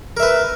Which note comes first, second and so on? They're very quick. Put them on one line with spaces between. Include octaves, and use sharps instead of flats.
A#4 E5 B4